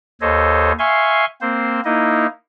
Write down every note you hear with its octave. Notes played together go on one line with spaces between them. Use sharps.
D#2 A4 C5 C#5 D#5
E5 F5 G#5 C6 C#6
A#3 C4 C5
A#3 D#4 E4 D#5